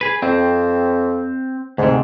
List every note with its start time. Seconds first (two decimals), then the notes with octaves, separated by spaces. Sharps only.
0.01 G#4 B4
0.22 F2 C4
1.78 D2 G#2 C3